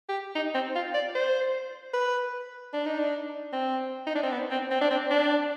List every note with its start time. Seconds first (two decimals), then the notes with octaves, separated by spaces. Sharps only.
0.09 G4
0.35 D#4
0.55 C4
0.75 F4
0.94 D5
1.15 C5
1.93 B4
2.73 D4
2.86 D#4
2.98 D4
3.53 C4
4.07 D#4
4.15 D4
4.23 C4
4.32 B3
4.51 C4
4.71 C4
4.81 D4
4.90 C4
5.10 D4